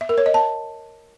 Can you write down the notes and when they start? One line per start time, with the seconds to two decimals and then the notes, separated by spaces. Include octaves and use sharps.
0.01 E5
0.09 A#4
0.18 C#5
0.26 D#5
0.34 A5